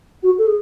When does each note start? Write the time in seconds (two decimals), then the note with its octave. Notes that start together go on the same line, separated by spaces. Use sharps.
0.22 F#4
0.38 A4
0.46 G#4